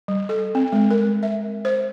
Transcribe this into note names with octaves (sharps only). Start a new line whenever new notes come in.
G3
A4
C4
G#3
A#4
E5
C5